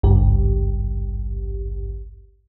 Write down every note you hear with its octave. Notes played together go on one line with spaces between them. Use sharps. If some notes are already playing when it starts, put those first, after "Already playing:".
G#1 C#2 G2 G4